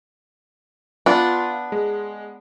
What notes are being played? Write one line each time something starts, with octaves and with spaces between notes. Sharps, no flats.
B3 D4 F4
G#3